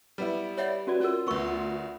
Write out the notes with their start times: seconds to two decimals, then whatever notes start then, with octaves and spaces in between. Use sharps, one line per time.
0.18 G3 B3 E4
0.58 C#5 D5 E5 F#5
0.87 C#4 F#4 B4 D5
1.00 C#4 F4 A#4
1.27 D2 B3 C#6 E6